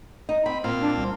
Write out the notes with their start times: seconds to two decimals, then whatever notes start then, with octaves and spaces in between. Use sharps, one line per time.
0.29 D#4
0.46 C4 B5
0.64 A#2 C4 F5
0.82 D4
0.97 C2